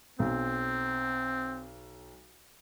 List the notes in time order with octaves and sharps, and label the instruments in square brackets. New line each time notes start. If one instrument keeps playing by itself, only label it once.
[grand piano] B1 [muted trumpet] C4